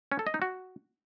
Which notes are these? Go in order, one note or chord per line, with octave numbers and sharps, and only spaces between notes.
C#4
A4
D#5
D#4
F#4